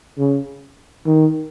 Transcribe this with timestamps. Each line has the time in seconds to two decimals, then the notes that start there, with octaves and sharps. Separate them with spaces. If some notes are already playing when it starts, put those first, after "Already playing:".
0.18 C#3
1.06 D#3